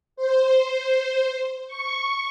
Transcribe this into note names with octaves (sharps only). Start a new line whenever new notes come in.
C5
C#6